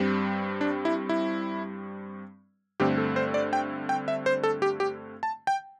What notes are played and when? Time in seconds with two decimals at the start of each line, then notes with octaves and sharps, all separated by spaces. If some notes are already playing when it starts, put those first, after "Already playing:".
Already playing: G2 G3 C4
0.61 D4
0.85 E4
1.09 E4
2.80 G2 D3 A3 C4 G4
2.98 A4
3.16 C5
3.34 D5
3.53 G5
3.89 G5
4.08 E5
4.26 C5
4.43 A4
4.62 G4
4.80 G4
5.23 A5
5.47 G5